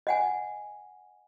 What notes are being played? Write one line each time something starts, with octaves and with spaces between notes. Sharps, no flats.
D#5 F#5 G#5